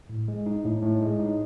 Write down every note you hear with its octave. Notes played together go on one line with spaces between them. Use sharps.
A2
G#3
D#4
A2
A2
G#3
D#4